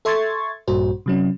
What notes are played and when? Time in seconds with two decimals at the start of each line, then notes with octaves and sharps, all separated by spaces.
0.05 A4 E5 C6 C#6 G#6 A6
0.68 A#1 G2 A#2 F#4 C5
1.06 C3 F#3 C#4